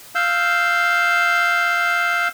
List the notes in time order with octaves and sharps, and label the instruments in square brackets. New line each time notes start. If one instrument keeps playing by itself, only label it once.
[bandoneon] F5 E6 G6